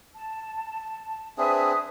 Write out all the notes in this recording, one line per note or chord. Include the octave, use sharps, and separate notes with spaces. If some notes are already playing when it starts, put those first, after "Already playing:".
A5
C4 D4 G#4 B4 E5 D#6